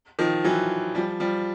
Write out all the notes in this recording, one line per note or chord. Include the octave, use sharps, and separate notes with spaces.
D#3 F3
E3 F#3
F3 G3
F3 G3